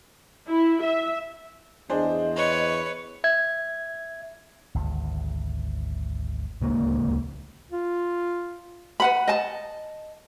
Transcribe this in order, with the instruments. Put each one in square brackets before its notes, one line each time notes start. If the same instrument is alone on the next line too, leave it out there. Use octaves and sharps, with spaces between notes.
[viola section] E4
E5
[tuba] E2 [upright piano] D4 G#4 C5 [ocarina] D#5
[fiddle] B4 C#5
[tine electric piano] E5 G#6
[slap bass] G#1 D2
[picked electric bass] D1 C#2 A#3
[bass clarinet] F4
[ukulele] B4 F#5 B5
D#5 A5